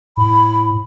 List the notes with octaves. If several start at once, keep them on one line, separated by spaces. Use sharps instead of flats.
A2 B5